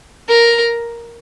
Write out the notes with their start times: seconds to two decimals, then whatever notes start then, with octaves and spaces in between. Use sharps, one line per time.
0.28 A#4